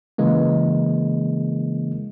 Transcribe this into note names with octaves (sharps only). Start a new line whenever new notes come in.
C#3 E3 G#3 A#3